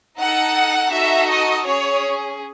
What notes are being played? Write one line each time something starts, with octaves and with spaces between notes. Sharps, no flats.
D#4 A4 F#5
D#4 F#4 A4 E5
D#5
C#4 G#4 C#5